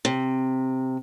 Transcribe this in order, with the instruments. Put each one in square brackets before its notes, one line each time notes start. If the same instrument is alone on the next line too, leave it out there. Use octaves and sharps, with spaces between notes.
[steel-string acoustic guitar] C3